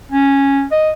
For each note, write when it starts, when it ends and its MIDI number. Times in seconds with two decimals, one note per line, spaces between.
0.12 0.65 61
0.71 0.91 75